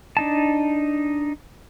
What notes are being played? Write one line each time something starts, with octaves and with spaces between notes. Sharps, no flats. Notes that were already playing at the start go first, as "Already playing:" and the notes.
D4 D#4 A5